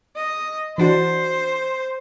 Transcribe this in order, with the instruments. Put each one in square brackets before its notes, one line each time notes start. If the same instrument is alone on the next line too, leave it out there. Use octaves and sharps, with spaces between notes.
[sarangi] D#5
[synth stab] E3 D4 F#4 [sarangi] C5